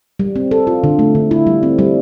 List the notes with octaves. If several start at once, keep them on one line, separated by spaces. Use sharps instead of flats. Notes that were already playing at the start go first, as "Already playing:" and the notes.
G3
C4
A4
F4
D3
A3
D3
E4
G3
C4
G3